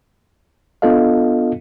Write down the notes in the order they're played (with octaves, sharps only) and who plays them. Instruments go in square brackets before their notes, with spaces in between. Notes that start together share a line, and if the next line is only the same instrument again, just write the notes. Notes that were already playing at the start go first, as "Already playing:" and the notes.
[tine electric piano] B3 D4 F4 A4 D#5 F5